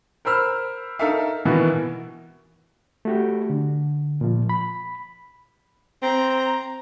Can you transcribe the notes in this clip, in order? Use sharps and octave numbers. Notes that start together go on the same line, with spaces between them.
A#4 C5 B5 E6 F6
D#4 A4 A#4 E5 F5
B2 D#3 E3 B3 E4 F#4
A3 F#4 G4
D3
A#2 F3
B5
C4 A#5